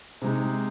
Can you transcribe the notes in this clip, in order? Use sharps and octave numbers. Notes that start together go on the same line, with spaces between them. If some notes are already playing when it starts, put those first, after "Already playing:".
C3 G#3 D#4